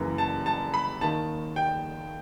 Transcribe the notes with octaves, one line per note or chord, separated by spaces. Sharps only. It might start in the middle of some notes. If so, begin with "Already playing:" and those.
Already playing: F#1 F#2 E3
A5
A5
B5
D#2 D#3 A5
G5